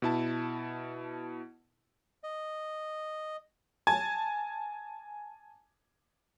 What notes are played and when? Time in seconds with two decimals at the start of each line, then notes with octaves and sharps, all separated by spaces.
0.02 B2 E4 A5
2.24 D#5
3.87 G#5 A5 G#6